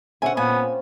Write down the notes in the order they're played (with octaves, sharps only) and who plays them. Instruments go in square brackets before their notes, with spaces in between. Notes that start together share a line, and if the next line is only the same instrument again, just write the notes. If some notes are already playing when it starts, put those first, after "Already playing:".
[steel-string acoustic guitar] B2 D3 E5 [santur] C4 C#4 [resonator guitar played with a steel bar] F#5 G#5
[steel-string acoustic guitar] A#2 [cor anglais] B3 [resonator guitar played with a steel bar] G#5
[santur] A#3